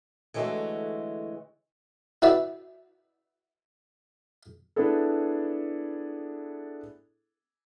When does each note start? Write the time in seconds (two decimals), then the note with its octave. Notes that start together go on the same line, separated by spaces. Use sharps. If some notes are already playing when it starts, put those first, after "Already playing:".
0.34 D3 E3 G#3 A3 F#4 C#5
2.22 E4 F#4 B4 D5 E5
4.76 B3 D4 E4 G#4 A4